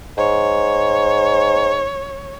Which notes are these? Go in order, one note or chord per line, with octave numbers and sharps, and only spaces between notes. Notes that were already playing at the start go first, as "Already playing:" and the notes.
G#2 C#5